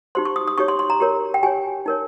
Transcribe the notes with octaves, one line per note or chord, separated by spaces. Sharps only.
D#4 G4 C5 C6
C#6
D#6
D#6
D#4 G4 C#5 C#6
C6
C6
A#5
G4 A#4 C#5
G5
G4 C#5 G#5
D#4 A#4 C#5